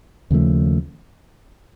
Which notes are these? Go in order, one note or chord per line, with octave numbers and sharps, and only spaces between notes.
D#2 C#3 F3 A3